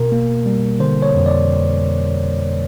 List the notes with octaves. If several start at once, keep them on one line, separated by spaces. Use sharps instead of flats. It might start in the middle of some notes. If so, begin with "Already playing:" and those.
Already playing: B2 A#4
A#3
G3
D3 C5
C#5
F2
D5